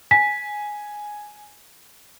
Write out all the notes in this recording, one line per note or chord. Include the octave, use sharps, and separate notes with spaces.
G#5 B6